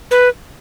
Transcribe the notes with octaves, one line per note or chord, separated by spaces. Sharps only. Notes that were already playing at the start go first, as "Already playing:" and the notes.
B4